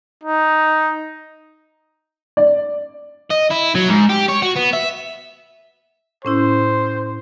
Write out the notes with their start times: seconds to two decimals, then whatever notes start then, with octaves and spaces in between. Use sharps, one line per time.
0.24 D#4
2.37 D5
3.30 D#5
3.50 E4
3.75 F#3
3.88 G#2
4.09 G4
4.28 C#5
4.42 F#4
4.56 B3
4.73 E5
6.25 A2 C#4 E4 C5